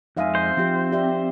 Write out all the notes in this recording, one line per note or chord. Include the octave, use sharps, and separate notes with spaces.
F2 G#3 D#4 E5 F5 G#5
C5
F3 C4 G4
G4 D5 E5